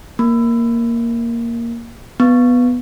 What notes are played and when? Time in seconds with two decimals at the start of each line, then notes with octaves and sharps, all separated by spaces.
0.19 A#3
2.20 B3